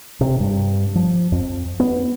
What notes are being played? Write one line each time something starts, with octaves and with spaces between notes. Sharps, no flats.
C3
G2
F3
F2
B3